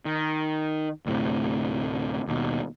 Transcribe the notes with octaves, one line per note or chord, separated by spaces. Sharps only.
D#3
D2 A2 C3
D#2 B2